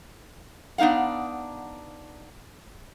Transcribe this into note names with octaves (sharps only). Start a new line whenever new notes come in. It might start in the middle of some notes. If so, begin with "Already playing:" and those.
B3 D4 D#4 F5 F#5